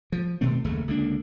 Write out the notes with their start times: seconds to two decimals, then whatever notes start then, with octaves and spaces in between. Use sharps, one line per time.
0.12 F3
0.41 B2 D#3 A3 C4
0.64 F#1 D#2 C#3 A3
0.88 C#2 D3 A#3 D4